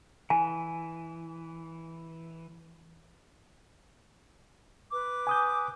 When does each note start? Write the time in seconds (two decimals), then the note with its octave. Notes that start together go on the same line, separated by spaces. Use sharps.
0.30 E3 G#5
4.92 B4 D6
5.27 G#5 D#6 G6